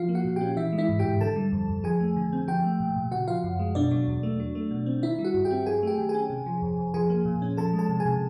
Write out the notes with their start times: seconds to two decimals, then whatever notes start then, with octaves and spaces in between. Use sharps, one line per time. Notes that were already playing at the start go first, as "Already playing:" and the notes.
Already playing: F3 F4 F5
0.09 A#3
0.15 F#4 F#5
0.25 A#2
0.36 C#4 G4 G5
0.57 E3 E4 E5
0.73 G#3
0.78 E4 E5
0.89 G#2
0.99 G4 G5
1.05 G#2
1.21 D3 A4 A5
1.36 G3
1.52 F2
1.69 F2
1.84 F3 G#4 G#5
2.00 A3
2.16 D3
2.32 C4
2.48 F3 G4 G5
2.64 A3
2.80 A#2
2.96 A#2
3.11 C#3 F#4 F#5
3.27 F3 F4 F5
3.44 F#2
3.59 G#3
3.75 B2 D4 D5
3.91 F#3
4.07 E2
4.23 A3
4.40 F#3
4.55 A3
4.71 B2
4.86 C4
5.03 D#3 E4 E5
5.19 G3
5.24 F#4 F#5
5.34 G2
5.45 G4 G5
5.51 C4
5.66 F#3 G#4 G#5
5.83 A3 G4 G5
5.98 D#3
6.09 G#4 G#5
6.15 C#4
6.30 C3
6.46 F3
6.62 F2
6.78 F2
6.94 F3 G#4 G#5
7.10 A#3
7.25 A#2
7.42 C#4
7.57 F3 A4 A5
7.73 G#3
7.79 A4 A5
7.89 C3
8.00 G#4 G#5
8.05 C3